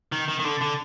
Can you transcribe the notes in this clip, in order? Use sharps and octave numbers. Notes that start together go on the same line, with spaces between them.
D#3
D#3
D#3
D3
D3